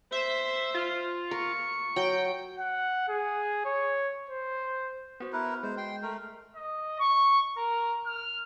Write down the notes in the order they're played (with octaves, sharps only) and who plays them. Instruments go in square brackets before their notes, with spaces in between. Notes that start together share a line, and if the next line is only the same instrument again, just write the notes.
[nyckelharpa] C5 [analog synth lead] E5
[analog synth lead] F4
[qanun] A#4 [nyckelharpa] C#6
[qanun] F#3 [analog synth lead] G5
[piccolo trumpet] F#5
G#4
C#5
C5
[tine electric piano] B3 F#4 C5
[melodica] E4 A#4 B4
[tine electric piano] G#3 [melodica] C5
[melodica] G5 C6
A3 A#4
[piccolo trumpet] D#5
C#6
A#4
F6